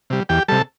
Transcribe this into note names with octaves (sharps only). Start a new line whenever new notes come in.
C3 G3
E2 G4 G5
C3 G3 A4 A5